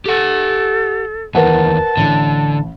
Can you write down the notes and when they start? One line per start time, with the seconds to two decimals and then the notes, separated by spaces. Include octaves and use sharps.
0.06 G4 A4 F#5
1.35 D#2 E3 A#4 B4 F#5 A5
1.97 A1 D3